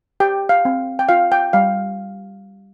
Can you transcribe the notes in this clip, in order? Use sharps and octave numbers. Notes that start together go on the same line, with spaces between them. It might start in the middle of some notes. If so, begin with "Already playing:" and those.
G4 G5
F5
C4
G5
F4 F5
G5
G3 F5